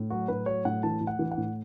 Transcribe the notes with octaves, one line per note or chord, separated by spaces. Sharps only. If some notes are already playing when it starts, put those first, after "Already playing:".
Already playing: A2
F#3 F#4
A2 B4
F#3 C#5
A2 F#5
E3 A5
A2
F#5
E3
F#5
A2